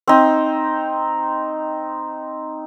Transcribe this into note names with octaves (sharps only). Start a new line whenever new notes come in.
C4 D#4